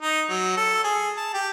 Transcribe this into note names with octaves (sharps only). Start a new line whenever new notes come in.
D#4
F#3
A4
G#4
A5
G4